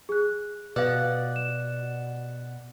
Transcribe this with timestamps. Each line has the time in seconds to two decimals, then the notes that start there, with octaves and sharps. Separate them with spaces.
0.09 G#4 F#6
0.76 B2 B4 D5 F5 F#5
1.36 E7